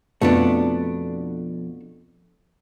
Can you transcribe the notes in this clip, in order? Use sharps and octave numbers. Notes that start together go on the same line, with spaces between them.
F2 B2 A3 B3 D4